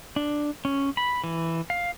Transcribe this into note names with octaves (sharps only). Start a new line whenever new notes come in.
D4
C#4
B5
E3
F5